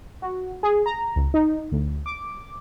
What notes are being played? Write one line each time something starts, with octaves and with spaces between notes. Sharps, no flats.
F#4
G#4
A#5
C#2
D#4
D2
D6